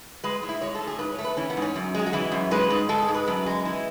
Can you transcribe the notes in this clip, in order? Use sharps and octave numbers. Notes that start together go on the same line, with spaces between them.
G#3 B4
A2
E4
G#3 C#5
A4
A2
G#4
G#2 B4
C#5
A3
B4
E3 C#4
B3
G#2
C#4
F#2
G#3 G#4
F#4
E3 E4
F#2
G#3 B4
G#2
G#3 A4
G#4
G#2
B4
F#2
G#3
E3